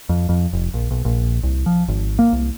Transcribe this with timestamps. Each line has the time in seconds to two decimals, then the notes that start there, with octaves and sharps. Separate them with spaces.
0.09 F2
0.29 F2
0.53 F1
0.74 A#1
0.91 B1
1.05 A#1
1.43 C2
1.66 F3
1.88 G#1
2.19 A#3
2.33 C2